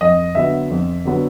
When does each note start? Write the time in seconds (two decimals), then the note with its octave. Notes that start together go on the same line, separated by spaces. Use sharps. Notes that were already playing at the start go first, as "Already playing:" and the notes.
0.01 F2 D#5
0.35 D3 F#3 B3 E5
0.70 F2
1.05 D3 F#3 B3